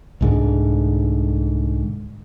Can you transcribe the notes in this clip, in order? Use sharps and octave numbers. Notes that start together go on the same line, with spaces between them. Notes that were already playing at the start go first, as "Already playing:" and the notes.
C2 G#2 D3